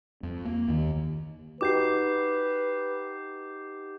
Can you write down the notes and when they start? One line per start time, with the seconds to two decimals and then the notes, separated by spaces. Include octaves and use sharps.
0.23 F2
0.45 A#3
0.68 D#2 D#3
1.61 D#4 F#4 G4 B4 D6 G6 C7